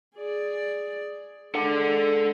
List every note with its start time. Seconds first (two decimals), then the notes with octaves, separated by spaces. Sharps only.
0.16 G#4 D5
1.55 G#3 D4 A4 F#5